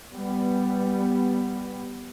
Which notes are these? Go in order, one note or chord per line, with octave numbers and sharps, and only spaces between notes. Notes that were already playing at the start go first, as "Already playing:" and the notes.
G3 B3